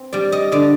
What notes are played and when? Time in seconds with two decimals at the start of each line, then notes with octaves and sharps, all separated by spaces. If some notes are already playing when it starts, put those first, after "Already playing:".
Already playing: C4
0.13 G3 D5
0.32 D#5
0.52 D3 D5